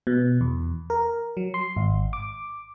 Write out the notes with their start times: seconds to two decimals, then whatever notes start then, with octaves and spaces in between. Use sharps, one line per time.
0.07 B2
0.41 E2
0.90 A#4
1.37 F#3
1.54 C6
1.77 G#1
2.13 D6